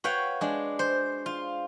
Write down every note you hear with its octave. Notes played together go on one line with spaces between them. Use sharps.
F#4 B4 C#5 F5 G5
G#3 D4
C5
F4